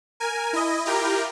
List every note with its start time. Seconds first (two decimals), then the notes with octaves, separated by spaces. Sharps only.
0.20 A#4 G#5
0.53 E4 D#5
0.85 E4 F4 G4 A#4